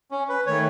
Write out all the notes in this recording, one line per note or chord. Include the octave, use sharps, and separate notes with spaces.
C#4
B4
D#3 A3 C#5